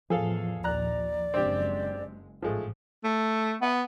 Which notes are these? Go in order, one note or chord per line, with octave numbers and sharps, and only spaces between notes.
E2 A2 F3 G#4 A4 F5
A#1 D#2 D5 A#5 F#6
F#1 G#3 C4 D4 G4
A1 G#2 F3 G#3 A3
A3
B3